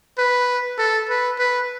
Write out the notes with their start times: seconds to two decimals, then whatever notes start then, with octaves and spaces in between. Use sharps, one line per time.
0.18 B4
0.78 A4
1.09 B4
1.39 B4